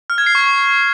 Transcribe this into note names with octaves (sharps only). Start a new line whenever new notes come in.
F6
G#6
C7
C#6